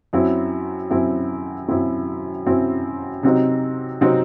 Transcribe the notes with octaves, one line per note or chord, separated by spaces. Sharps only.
F#2 F#3 C4 E4
F#2 F#3 C4 E4
F#2 F#3 C4 E4
F#2 F#3 C4 E4
C3 F#3 C4 D#4
C3 F#3 C4 D#4